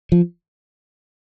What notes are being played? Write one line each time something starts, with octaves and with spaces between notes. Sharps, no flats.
F3